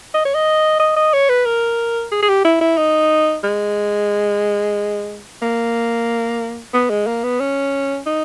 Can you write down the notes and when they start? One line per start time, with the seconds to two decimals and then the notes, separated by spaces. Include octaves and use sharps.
0.14 D#5
0.25 C#5
0.35 D#5
0.80 D#5
0.96 D#5
1.13 C#5
1.29 B4
1.46 A#4
2.12 G#4
2.22 G#4
2.29 G4
2.44 E4
2.61 E4
2.77 D#4
3.44 G#3
5.42 A#3
6.74 B3
6.90 G#3
7.07 A#3
7.24 B3
7.40 C#4
8.06 D#4